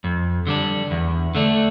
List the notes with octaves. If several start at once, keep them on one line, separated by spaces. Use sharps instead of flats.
F2
D3 G3 D4
E2
D3 A3 D4